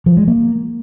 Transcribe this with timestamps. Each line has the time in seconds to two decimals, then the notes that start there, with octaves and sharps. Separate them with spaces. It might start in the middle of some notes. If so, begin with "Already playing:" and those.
0.06 F3
0.17 G#3
0.27 A#3